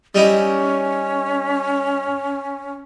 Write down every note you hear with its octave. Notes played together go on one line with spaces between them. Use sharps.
G3 C#4 D#4 E4